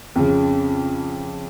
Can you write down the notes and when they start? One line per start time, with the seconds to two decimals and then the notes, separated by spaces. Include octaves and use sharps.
0.16 F2 C#3